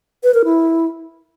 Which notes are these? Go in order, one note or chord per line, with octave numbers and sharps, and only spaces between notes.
B4
A#4
E4